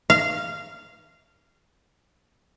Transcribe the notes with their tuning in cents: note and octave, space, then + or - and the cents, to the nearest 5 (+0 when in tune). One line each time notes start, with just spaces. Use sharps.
F5 -15